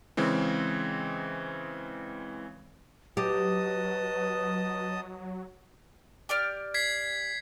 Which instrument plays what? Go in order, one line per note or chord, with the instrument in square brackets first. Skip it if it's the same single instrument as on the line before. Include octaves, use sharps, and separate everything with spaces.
[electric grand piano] C#3 E3 G#3 C4
[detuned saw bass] F#3 [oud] G4 [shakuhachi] B4 [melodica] D#5 A5 D#6
[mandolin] G4 D5 F6
[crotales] G#6 B6 C7